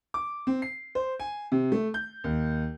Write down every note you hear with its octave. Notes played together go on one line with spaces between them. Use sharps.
D6
C4
C7
C5
G#5
C3
A3
G6
D#2